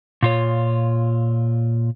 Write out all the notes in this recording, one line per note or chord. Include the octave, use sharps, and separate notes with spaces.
A#2 F4 C#5